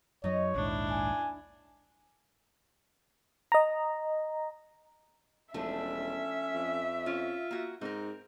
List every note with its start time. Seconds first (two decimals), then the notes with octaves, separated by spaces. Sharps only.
0.24 F#2 F#3 D#4 C#5 D#5
0.55 A#1 D#2 G#2 D4 E4
0.90 G#5
3.52 D#5 A#5
5.54 E1 F3 A3 C#4 D4 E5
6.55 F2
7.06 C#4 F4
7.51 A#3 F#4
7.81 G#2 C4 D#4 A#4